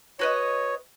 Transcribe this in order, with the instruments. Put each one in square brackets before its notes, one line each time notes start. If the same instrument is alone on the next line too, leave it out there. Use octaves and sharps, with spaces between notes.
[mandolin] F#4 B4 D#5 [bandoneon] C#5